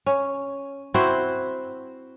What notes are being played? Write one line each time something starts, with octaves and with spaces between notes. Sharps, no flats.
C#4
C4 E4 F#4 C5